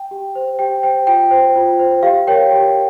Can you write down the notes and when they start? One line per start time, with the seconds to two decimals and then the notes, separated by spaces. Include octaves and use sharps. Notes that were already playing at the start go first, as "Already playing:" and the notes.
Already playing: G5
0.11 G4
0.35 C5
0.59 G4 G5
0.83 C5 G5
1.07 F4 G5
1.31 C5
1.56 F4
1.79 C5
2.03 G4 F5
2.27 A#4 C#5 G5
2.52 G4